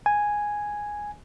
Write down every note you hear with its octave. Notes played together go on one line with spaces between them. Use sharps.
G#5